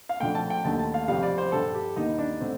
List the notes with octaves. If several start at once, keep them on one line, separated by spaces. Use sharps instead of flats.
F5
F2 D3 A3 G5
A5
G5
D#2 D3 A3 A5
A5
F5
F2 C3 G3 F5
D5
C5
G2 D3 G3 A4
G4
D#2 D3 G3 A#3 D#4
D4
D3 A3 C4